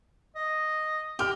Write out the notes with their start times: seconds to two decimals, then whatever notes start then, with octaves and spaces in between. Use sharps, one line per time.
0.36 D#5
1.19 G4 G5 F6